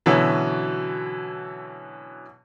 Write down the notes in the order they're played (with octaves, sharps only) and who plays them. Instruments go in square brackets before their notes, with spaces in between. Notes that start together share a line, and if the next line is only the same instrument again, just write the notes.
[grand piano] B2 D3 E3 F#3 C#4